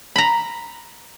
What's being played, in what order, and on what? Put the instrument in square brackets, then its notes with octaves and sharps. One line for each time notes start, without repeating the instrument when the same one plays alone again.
[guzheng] A#5 B5